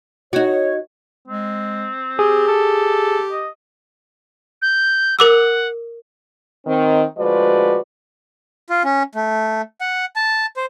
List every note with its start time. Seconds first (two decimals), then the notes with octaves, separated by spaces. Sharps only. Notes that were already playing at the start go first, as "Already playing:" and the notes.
0.33 D#4 F#4 C#5
1.28 G#3 C4
2.19 G4 G#4
2.48 A4
3.32 D#5
4.62 G6
5.19 A#4 F#5 D6 E6
6.66 D#3 C4
7.18 D2 F3 G#3 F#4 B4 D5
8.70 F4
8.84 C#4
9.15 A3
9.81 F#5
10.16 A5
10.57 C5